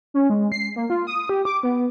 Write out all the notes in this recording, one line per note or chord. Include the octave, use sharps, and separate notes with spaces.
C#4
G#3
C7
A#3
F4
D#6
G4
D6
B3